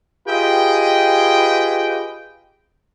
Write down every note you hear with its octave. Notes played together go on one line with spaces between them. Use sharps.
F4 G4 G#4 B4 D#5 G5